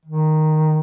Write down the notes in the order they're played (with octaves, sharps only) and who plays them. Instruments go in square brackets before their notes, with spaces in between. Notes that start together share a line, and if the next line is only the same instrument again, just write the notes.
[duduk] D#3